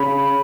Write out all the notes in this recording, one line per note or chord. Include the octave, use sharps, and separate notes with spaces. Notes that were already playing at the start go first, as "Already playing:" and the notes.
Already playing: C#3 B5